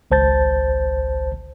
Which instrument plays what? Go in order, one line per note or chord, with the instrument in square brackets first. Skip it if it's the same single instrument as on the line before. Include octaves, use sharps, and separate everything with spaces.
[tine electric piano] G#1 C#2 C5 A5 G6 A6